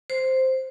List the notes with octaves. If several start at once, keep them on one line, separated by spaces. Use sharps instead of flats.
C5